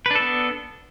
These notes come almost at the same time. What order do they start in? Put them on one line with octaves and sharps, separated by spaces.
B4 D4 A4 B3